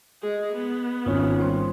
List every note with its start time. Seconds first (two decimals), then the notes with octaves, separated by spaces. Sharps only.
0.23 G#3 G#4
0.53 B3
1.06 G#1 C#4 D#4 F4
1.40 G3 C5 C6